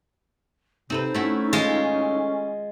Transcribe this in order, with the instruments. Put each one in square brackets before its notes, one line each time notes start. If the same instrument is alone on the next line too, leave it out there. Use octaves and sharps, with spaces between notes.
[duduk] C3 [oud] C4 A4 B4 [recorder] D#4
[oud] A3 E4 F#4 [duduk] C#4
[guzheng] G#3 F4